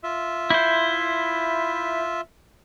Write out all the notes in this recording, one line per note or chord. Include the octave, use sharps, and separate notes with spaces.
F4 E5
E4 C5